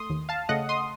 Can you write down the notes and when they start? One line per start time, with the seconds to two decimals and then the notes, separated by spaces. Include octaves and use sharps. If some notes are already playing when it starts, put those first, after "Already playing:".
Already playing: A3 C6 D#6
0.10 D#2
0.29 F5 A5
0.49 C#3 A3 D#5 F#5
0.69 C6 D#6